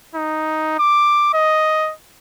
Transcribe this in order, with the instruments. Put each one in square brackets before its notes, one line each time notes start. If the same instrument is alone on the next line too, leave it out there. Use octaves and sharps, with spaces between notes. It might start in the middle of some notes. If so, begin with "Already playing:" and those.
[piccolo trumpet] D#4
D6
D#5